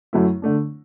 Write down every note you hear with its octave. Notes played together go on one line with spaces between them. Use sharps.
F#2 F#3 A3 E4
D3 A3 D4